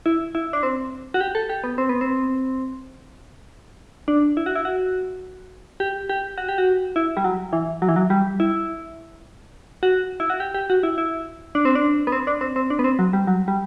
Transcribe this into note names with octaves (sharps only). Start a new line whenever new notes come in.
E4
E4
D4
C4
F#4
G4
A4
G4
B3
C4
B3
C4
D4
E4
F#4
E4
F#4
G4
G4
F#4
G4
F#4
E4
G3
F#3
E3
F#3
E3
F#3
G3
E4
F#4
E4
F#4
G4
G4
F#4
E4
E4
D4
C4
D4
B3
C4
D4
C4
C4
D4
B3
C4
F#3
G3
F#3
G3